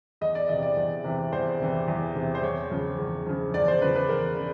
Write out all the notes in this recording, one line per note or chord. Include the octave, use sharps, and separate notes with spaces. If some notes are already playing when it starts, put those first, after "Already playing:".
E2 D#5
D5
C3 E3 D#5
D5
E2
C3 E3
E2 C5
C3 E3
E2
C3 E3
C5
E2 C#5
C#3 F3
E2
C#3 F3
E2 D5
C5
C#3 F3 B4
B4
E2 A#4
C#3